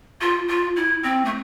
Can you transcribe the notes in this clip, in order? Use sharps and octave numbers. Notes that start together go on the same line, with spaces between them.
F4
F4
E4
C4
A3